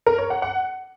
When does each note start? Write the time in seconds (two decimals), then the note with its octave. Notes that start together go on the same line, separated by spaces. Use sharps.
0.06 A#4
0.18 C#5
0.30 F#5
0.42 F#5